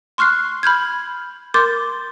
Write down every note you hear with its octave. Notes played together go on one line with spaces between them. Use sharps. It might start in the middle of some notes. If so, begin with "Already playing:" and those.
C6 C#6 F6 F#6 C7
B5 F6 G6 G#6
A#4 C6 D6 G6 A6